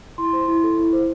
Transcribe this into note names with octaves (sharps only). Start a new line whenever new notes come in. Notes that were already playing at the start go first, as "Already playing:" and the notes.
E4 C6
C5
E4
A4
E4
C5